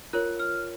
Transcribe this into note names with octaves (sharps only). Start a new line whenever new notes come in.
F4 A#4 C#5 F#6
F6